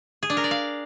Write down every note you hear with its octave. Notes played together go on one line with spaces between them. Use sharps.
G#4
D4
A#4
D5
F5